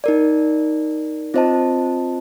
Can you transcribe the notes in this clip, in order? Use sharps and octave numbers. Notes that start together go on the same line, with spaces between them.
D#4 A#4 D5
C4 F4 C5 D#5 A5